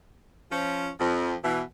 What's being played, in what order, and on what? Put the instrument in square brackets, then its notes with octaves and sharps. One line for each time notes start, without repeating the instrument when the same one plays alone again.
[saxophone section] F3 C#4
F2
B2 E3